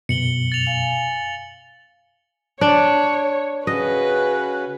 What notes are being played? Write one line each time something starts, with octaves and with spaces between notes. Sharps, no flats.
F#2 B2 C#7 F#7 G7
A6 F7
F5 G#5
D4 C#5
C#3 C#4 F#4 B4 D#5